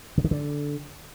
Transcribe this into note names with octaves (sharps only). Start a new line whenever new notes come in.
C#3
D#3
D3